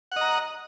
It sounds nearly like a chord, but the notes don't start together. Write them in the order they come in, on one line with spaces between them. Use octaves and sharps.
F#5 D#5 A#5